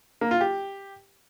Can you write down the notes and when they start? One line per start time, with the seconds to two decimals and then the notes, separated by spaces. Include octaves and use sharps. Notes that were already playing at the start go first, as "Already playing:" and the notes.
0.21 A#3
0.31 F4
0.41 G4